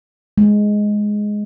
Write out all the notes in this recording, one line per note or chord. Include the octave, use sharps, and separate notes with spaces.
G#3